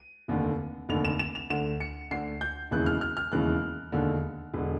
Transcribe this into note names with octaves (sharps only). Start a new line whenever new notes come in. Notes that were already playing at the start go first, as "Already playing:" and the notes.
Already playing: D#7
F1 D#2 D3
F1 D#2 D3 F7
E7
E7
F7
D2 D3 E7
C#7
D2 D3 C7
G6
E1 D#2 C#3 E3 F#6
F6
F6
F6
E1 D#2 C#3 E3 F#6
E1 D#2 D3
E1 D3